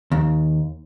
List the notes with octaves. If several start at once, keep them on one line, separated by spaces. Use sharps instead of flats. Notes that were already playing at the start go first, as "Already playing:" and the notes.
D#2